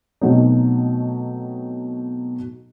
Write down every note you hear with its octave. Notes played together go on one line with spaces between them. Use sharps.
B2 F#3 A3 C4 D#4